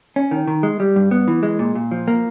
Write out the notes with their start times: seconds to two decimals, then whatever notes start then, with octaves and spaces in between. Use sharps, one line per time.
0.16 C#4
0.31 D#3
0.48 D#3
0.63 G#3
0.80 G3
0.96 G2
1.11 B3
1.28 E3
1.43 G#3
1.59 A#2
1.75 A#2
1.91 F3
2.08 A#3